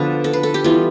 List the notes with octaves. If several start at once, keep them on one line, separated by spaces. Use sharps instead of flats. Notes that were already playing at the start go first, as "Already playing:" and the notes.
Already playing: D3 F3 B3 B4
A4
B4
A4
G4
E3 G3 B3 F4